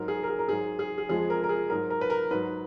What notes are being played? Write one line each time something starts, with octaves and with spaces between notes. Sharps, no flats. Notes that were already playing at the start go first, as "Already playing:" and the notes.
Already playing: G#2 F#3 A#4
G#4
A#4
G#4
A#4
G#2 F#3 G#4
G#4
G#4
F2 F3 G#3 G#4
A#4
A#4
G#4
G#2 F#3 A#4
A#4
B4
A#4
G#2 F#3 B4